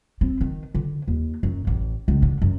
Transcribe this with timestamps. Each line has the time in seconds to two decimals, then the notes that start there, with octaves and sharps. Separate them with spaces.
0.21 C4
0.41 D#3
0.75 D3
1.08 D#2
1.43 F#2
1.67 A1
2.08 C#2
2.22 D3
2.42 F#2